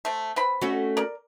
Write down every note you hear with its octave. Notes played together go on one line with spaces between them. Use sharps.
A3 C4
C4 B4 B5
A3 C#4 F#4
A#4 D5